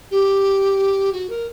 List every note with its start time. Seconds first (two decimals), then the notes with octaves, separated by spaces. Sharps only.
0.11 G4
1.12 F#4
1.30 A#4